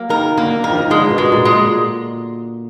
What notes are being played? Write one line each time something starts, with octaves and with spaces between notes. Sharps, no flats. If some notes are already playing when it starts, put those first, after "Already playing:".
Already playing: F#3 A#3
D#3 A#4
D3 A#3
D#3 A#4
F3
D#3
D3 G#3
B2
G#3
A#2
G#3
A#2